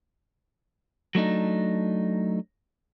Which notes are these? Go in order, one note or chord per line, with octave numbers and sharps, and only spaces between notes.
F#3 A3 D4 D#4